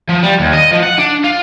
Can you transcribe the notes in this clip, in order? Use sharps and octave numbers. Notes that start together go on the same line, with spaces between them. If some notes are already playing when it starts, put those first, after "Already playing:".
F3
G3
D#2
D#5
F3
F#5
D4
F4